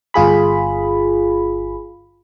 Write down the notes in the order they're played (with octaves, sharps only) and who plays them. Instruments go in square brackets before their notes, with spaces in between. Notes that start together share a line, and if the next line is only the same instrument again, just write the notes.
[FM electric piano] G1 F4 G#4 B5